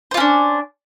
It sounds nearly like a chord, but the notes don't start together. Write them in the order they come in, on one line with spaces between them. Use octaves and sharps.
C5 F4 C#4 D4